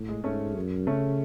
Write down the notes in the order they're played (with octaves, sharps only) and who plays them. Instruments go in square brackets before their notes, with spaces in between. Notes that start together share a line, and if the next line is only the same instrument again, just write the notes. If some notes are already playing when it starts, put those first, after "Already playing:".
Already playing: [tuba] A2
[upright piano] G#3
[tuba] G#2 [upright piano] A3 C#4
[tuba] F#2
[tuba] C#3 [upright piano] A3 C#4